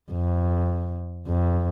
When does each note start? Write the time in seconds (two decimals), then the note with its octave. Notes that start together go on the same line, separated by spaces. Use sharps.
0.11 F2
1.28 F2